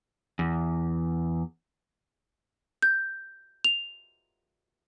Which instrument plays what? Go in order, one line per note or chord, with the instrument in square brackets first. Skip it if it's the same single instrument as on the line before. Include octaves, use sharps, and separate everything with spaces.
[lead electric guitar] E2
[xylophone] G6
F7